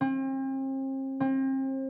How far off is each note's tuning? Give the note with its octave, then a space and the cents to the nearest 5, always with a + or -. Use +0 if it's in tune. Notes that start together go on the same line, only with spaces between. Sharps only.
C4 +40
C4 +35